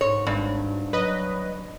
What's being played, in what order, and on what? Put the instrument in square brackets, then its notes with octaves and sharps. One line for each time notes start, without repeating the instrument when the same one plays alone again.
[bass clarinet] G#2 [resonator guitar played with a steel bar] C#5
[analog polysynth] G#1 [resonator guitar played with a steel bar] G2
[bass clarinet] F#3 [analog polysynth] B4 D#5